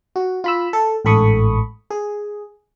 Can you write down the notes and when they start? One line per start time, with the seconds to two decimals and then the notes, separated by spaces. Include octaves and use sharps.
0.16 F#4
0.44 F4 B5 E6
0.73 A4
1.05 A1 G#2 A4 B5 C#6 D#6
1.90 G#4